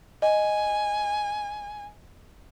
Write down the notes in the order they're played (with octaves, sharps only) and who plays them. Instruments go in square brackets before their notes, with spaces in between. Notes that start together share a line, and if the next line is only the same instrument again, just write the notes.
[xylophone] D#5 [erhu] G#5